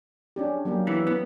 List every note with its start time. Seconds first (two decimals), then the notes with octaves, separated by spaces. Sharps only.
0.36 C#4 D4 G4
0.65 F#3 A#3 G4
0.87 E3 B3
1.07 B3